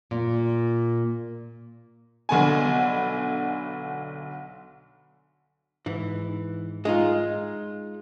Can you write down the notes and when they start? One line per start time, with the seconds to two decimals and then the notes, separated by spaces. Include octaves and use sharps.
0.11 A#2
2.29 B1 D3 B3 G#5
5.86 G#2 E3
6.85 G#3 D#4 F4